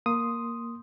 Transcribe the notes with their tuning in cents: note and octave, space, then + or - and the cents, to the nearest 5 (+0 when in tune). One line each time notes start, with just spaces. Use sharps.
A#3 +0 C6 +0 D#6 +0